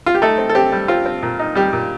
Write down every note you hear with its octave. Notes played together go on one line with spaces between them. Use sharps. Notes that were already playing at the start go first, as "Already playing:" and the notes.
F4
G4
A3 D#4 A4
C4
A4
C4 G4
G3
C4 F4
C4
A#2
D#4
G3 G4
A#2